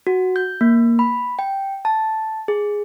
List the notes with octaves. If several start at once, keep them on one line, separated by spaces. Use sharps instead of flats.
F#4
G6
A#3
B5
G5
A5
G#4